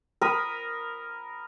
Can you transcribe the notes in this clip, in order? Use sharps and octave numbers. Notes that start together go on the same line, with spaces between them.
A#4 B5 D#6